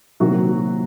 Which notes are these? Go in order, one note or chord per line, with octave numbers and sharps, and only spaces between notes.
C3 D#3 F#3 A#3 F#4